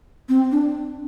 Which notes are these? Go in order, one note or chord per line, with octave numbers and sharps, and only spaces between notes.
C4
D4